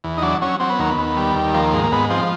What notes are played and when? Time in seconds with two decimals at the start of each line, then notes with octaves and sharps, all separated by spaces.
0.04 E2
0.18 D#4
0.22 F#3 D4
0.42 F#3 C#4
0.60 F#3 C4
0.70 B3
0.79 D#2 A#3
0.90 B3
0.97 D#2
1.17 G3
1.36 D#2
1.54 F3 A#3
1.73 G#2
1.84 A#3
1.92 G#2 B3
2.10 F3 C4